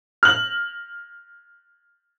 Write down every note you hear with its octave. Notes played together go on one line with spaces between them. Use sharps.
F6 F#7